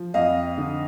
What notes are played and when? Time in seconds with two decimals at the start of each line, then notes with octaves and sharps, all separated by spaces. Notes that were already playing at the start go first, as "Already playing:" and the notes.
Already playing: F3
0.14 F2 D#5 F5
0.58 D3